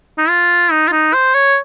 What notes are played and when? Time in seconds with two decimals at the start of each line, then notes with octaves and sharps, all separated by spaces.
0.18 D#4
0.29 F4
0.71 D#4
0.88 F4
0.92 D#4
1.13 C5
1.35 C#5